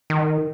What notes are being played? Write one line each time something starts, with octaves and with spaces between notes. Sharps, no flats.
D#3